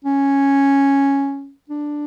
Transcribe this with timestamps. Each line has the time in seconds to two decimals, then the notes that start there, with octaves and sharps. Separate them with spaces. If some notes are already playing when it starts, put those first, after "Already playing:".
0.05 C#4
1.70 D4